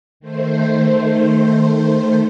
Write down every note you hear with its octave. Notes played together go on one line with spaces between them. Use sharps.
D#3 A3 C5